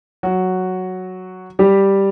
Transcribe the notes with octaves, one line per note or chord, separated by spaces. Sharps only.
F#3 F#4
G3 G4